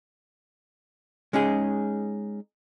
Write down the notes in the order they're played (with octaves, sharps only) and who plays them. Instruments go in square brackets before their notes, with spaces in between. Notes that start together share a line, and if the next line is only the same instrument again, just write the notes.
[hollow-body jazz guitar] G#3 C#4 D#4 G#4